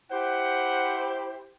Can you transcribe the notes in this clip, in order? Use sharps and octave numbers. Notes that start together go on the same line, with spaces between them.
E4 G4 C5 F#5